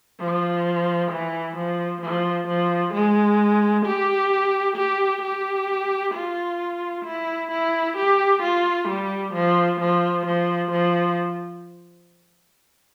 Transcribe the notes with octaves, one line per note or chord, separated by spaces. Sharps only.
F3
E3
F3
F3
F3
G#3
G4
G4
G4
F4
E4
E4
G4
F4
G3
F3
F3
F3
F3